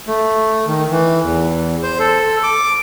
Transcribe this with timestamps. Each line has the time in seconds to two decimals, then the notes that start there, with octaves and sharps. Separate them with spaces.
0.07 A3
0.68 D#3
0.91 E3
1.23 E2
1.83 C5
1.99 A4
2.43 D6